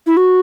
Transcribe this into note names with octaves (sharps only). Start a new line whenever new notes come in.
E4
F#4